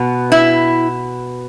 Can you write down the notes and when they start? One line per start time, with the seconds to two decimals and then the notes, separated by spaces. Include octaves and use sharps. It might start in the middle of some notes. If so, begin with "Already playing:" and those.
Already playing: B2 B3
0.32 E4